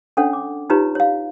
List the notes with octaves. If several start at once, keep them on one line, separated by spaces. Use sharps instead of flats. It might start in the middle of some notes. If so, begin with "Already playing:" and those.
C#4 D4 A4 C#5 F#5
D6
D#4 F4 G4 B4 C#5 A#5
C#5 F5